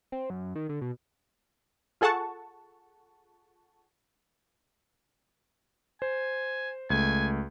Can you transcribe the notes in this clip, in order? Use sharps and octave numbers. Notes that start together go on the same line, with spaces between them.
C4
F#2
D#3
D3
B2
F4 G#4 A4 F#5 A5 C#6
C5 G#5
C#2 A3 G#5